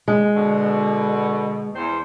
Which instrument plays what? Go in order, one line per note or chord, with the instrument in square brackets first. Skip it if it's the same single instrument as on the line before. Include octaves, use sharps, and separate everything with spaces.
[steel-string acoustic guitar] G#3
[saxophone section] B2 D3
E2 C5